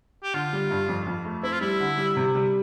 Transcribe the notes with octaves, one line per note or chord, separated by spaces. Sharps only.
G4
D3 F4
G3
G2
F2
F2
A3
C4 E4
F4
G3 E4
D3
G3
C3
G3